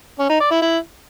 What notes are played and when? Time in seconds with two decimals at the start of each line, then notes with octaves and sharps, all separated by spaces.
0.19 C#4
0.30 D#4
0.40 D5
0.51 E4
0.62 E4